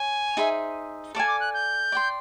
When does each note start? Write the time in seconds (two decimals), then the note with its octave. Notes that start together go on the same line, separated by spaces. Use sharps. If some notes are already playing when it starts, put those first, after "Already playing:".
Already playing: C#5 G#5
0.37 D#4 G#4 C5 E5
1.15 A4 D5 F5 G#5 A5
1.27 D6
1.40 F#6
1.54 G6
1.92 D5 G5 C6